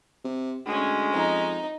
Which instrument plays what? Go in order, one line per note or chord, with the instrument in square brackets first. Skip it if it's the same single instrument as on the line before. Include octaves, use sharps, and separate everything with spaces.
[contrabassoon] C3
[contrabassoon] D2 [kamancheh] G#3 C#4
[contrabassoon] F2 [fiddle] D#4